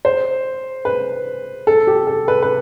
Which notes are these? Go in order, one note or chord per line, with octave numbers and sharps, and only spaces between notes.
C5
B4
A4
G4
A4
B4
B4